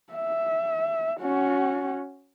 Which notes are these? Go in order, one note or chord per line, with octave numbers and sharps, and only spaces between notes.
E5
C#4 F#4